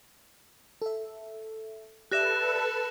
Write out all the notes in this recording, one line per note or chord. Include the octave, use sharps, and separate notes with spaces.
A4 E5
G4 A4 B4 D5 E5 F#6 A#6 E7